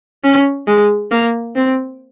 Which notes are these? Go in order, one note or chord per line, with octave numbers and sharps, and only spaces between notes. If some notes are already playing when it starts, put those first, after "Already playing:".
C#4
G#3
A#3
C4